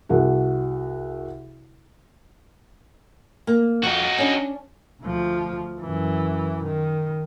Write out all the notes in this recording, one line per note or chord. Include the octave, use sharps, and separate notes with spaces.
C2 F#4 G#4
A#3
F2 D#4 F#4
C#4 D4
D2 F3
F#2 E3
D#3